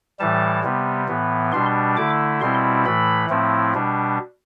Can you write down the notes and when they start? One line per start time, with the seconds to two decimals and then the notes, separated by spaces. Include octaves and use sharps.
0.19 A2 E3 G3 A5
0.64 C3 G3 B3
1.08 A2 E3 B3
1.52 B2 G3 D4 C6
1.97 D3 A3 E4 D6
2.41 B2 G3 C4 E4 C6
2.86 A2 E3 A3 B5
3.30 A2 F3 A3 C4 E4
3.74 B2 G3 D4